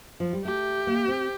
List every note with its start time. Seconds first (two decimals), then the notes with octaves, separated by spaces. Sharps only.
0.20 F3
0.33 G3
0.44 A3 G4
0.87 A#3
1.08 C4